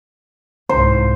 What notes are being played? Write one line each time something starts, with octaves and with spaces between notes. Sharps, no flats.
C2 G#2 C5